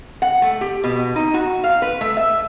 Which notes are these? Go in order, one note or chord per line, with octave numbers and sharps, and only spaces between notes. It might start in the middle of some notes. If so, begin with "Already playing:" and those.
F#5
A3
G4
B2
D#4
F#4
F5
B4
A3
E5